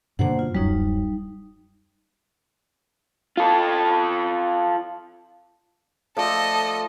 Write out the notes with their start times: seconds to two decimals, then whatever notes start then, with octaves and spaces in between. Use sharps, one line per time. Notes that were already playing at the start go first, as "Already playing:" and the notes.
0.19 G2 B2 D3 A#3 C5 F#5
0.39 F4
0.55 D1 F#2 F#3 G3 D#4
3.37 F4 A4
6.17 F3 A3 A4 D5 D#5